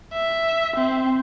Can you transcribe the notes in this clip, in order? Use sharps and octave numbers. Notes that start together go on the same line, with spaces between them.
E5
C4